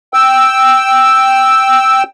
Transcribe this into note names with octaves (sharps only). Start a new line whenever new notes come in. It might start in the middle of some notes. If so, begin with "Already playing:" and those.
G5 E6